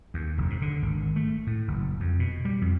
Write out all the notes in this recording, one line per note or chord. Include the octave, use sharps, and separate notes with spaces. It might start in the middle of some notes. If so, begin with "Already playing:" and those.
D#2
F1
G#2
D3
G#1
A3
A2
F#1
F2
B2
G3
F2